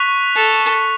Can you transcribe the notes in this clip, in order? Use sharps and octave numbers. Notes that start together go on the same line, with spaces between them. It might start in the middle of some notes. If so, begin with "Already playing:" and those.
Already playing: C#6 F#6 B6 F7
A4